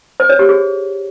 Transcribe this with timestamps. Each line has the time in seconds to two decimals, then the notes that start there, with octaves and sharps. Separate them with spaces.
0.20 C5
0.29 C#5
0.39 G4
0.49 G#4